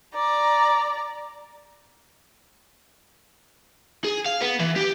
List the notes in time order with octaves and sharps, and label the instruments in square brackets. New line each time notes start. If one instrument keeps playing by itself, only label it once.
[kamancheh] D5 A#5
[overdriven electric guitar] G#4
F5
B3
E3
G4